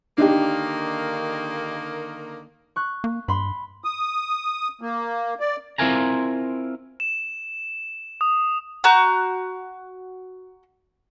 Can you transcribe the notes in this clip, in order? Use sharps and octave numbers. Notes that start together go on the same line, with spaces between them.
D3 D#3 A#3 D4 D#4 G4
C#6 F#6
A#3
G2 B5 C6
D#6
A#3
D5
C4 E4 F4 A#4 G#5 A#5
E7
D#6
F#4 A#5 F#6 G6